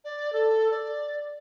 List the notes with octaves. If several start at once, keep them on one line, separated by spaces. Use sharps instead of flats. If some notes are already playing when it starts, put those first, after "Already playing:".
D5
A4
D5